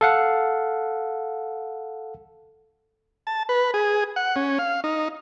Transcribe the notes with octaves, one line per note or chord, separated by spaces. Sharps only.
A4 F5 F#5
A5
B4
G#4
F#5
C#4
F5
D#4